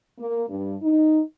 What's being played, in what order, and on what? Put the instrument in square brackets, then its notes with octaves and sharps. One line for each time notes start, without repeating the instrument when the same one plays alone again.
[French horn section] A#3
G2
D#4